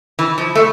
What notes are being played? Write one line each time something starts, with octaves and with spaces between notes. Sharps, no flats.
E3
F3
A3